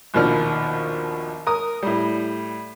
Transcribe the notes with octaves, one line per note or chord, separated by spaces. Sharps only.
A#1 D#2 B2 F3 D5 F6
A#4 D#6
A2 G3